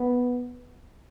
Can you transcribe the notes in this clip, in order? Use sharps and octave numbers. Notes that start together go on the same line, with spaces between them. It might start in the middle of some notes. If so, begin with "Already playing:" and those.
Already playing: B3